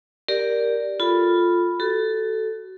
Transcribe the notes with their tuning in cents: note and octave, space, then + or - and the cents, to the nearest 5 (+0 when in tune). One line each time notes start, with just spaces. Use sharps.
G4 +0 A#4 +0 D5 +0
F4 +0 A4 +5 B5 +0
F#4 +30 A4 +0